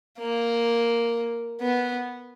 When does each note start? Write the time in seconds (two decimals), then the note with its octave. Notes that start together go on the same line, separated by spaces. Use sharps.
0.19 A#3
1.61 B3